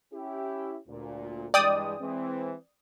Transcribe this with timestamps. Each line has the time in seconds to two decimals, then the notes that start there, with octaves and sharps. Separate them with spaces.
0.13 C#4 E4 G4
0.88 D2 A#2
1.54 G2 E3 G#3 D5 G5 D#6
2.00 E3 G#3 C4